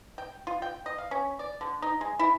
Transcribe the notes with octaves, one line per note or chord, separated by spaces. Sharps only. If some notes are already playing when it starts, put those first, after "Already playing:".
G5
F4
G5
D#5
F5
C#4
D5
D3
D#4
G#3
E4